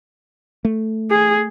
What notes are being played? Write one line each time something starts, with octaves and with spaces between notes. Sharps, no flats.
A3
G#4